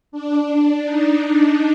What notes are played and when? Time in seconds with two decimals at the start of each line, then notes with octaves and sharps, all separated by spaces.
0.12 D4
0.84 D#4